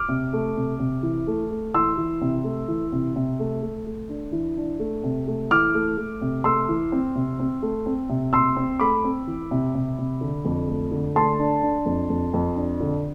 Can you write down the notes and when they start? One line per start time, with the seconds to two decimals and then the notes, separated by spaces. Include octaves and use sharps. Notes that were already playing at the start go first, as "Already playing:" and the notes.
Already playing: D6 F6
0.09 C3
0.33 A3
0.57 C3
0.79 C3
1.03 E3
1.27 A3
1.51 A3
1.74 E3 C6 E6
1.97 E3
2.21 C3
2.44 A3
2.68 E3
2.92 C3
3.16 C3
3.39 A3
3.62 A3
3.86 A3
4.09 D4
4.32 E3
4.57 D4
4.79 A3
5.03 C3
5.27 A3
5.51 E3 D6 F6
5.74 A3
5.97 A3
6.21 C3
6.44 A3 C6 E6
6.69 E3
6.92 C4
7.15 C3
7.39 C4
7.62 A3
7.86 C4
8.09 C3
8.33 C3 C6 E6
8.56 C4
8.80 A3 B5 D6
9.04 C4
9.27 E3
9.51 C3
9.75 C3
9.98 C3
10.21 D3
10.45 F2
10.68 A3
10.91 D3
11.15 A3 A5 C6
11.39 D4
11.63 D4
11.86 F2
12.10 F2
12.33 F2
12.56 D4
12.80 D3